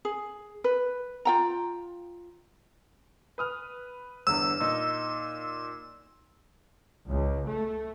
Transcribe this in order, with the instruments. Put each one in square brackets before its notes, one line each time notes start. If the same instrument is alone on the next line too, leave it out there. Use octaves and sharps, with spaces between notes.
[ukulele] G#4
B4
F4 G5 A#5
[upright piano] B4 D#6 F6
[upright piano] G1 E2 D3 [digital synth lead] E6
[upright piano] A#2 D#4
[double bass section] C#2
A3